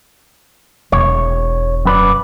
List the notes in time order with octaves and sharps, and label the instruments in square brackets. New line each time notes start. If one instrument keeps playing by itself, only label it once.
[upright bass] E1 [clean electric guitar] C#5
[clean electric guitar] F#2 B4 D5